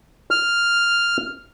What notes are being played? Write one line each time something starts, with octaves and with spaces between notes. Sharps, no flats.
F6